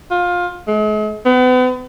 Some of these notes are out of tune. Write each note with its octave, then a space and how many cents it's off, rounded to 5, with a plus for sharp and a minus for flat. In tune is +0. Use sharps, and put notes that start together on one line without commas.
F4 +20
G#3 +45
B3 +40